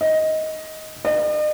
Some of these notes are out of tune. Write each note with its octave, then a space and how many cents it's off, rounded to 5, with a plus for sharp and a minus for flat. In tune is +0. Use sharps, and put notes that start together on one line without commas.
D#5 +10
D#5 -45